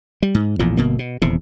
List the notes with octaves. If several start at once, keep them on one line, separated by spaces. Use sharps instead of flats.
G3
G#2
A#1 E2 A2 F3
G1 B2 A#3
B2
D#1 E2 C3